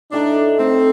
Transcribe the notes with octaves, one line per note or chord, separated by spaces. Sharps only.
A2 A3 D4 D#4 A4
A2 A3 C4 D#4 A4